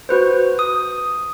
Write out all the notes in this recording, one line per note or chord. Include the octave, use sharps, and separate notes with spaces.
F#4 B4 C5
D#6